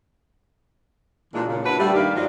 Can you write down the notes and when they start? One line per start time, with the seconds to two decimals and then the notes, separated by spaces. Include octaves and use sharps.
1.34 A#2 E3 F#3 G#3 D4
1.47 A#2 C#3
1.64 A#3 D4 E4 F#4 B4
1.79 G3 A3
1.94 G2 D#3 A#3 G4 D5 F5
2.15 F3 F#3 G#3 D4 D#4